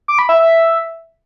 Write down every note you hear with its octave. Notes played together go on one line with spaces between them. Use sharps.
D6
B5
E5
E5